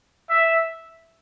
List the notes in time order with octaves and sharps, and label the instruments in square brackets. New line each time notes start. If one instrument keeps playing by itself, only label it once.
[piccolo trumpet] E5